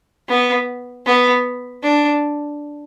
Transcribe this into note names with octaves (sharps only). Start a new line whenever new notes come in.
B3
B3
D4